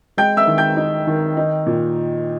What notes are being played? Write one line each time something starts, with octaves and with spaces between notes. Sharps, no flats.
G#3 G5 G6
E5 E6
D#3
G5 G6
D#4
D#3
D#4
A#2